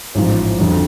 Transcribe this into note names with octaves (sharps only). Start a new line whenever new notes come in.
A1 G#2 F3
F2 D3 F#3